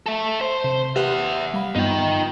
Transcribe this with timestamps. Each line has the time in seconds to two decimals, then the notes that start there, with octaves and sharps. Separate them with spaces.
0.06 A4 E5
0.41 C5
0.64 C3
0.96 G4 B4 E5 F#5
1.54 G3 F5 B5
1.76 G2 B3 D#4 F4 G5